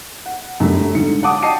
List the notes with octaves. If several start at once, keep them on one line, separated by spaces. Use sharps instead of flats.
F#5
F#2 D3 G3 A3
G#2 D3 C#7
F5 F#5 A5 D6 D#6
D#5 G5 A5 C7 C#7 D#7